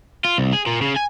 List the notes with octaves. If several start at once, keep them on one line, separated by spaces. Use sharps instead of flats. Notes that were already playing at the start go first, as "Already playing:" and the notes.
F4
C2
G#4
A#2
C#3
G#5